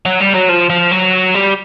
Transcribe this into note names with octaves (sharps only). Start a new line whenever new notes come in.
F#3
G3
F#3
F3
F3
F#3
G3